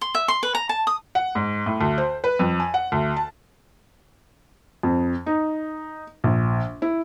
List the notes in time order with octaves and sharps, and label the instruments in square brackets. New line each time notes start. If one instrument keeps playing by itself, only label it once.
[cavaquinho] C6
E5
C6
B4
A#5
A5
D#6
[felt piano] F#5
G#2
A2
D2
C5
B4
F2
G#5
F#5
D2
A5
F2
D#4
A#1
E4